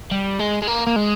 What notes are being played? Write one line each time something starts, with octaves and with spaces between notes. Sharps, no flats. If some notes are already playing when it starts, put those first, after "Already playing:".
G3
G#3
G#3
A#3
A#3
G#3